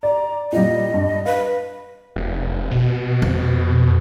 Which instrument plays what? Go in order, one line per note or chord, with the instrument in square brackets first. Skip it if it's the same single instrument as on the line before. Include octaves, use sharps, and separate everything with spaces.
[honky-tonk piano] D5 [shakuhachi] A#5
[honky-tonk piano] A#2 G3 [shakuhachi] D#5
[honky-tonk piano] G2
[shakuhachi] B4 [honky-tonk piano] F5
[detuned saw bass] F1
B2
[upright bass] F2